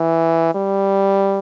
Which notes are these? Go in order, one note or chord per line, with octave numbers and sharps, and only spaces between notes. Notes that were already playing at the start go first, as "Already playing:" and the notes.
Already playing: E3
G3